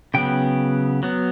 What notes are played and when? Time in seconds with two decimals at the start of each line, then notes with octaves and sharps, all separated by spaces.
0.14 C#3 F#3 B3 G5
1.03 F#3 B3